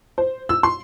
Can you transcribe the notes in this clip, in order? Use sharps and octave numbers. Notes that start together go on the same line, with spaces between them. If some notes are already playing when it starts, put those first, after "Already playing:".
C5
E6
C6